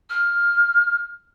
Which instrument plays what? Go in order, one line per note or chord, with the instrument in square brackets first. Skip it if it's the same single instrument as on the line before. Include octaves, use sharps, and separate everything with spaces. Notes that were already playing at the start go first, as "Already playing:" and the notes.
[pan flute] F6